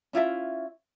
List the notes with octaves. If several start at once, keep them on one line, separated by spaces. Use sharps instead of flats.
C#4 E4 F4 E5